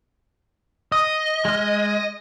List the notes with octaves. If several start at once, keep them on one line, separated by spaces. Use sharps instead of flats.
D#5 D#6
G#3 F6